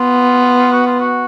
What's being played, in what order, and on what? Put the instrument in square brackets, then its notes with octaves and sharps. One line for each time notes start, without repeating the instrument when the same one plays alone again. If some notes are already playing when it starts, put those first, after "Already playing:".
Already playing: [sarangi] B3 [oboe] F4
[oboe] F#4
F4
F#4